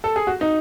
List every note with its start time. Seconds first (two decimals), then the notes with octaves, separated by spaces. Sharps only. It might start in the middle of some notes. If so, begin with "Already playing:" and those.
0.04 A4
0.16 G#4
0.27 F#4
0.41 D#4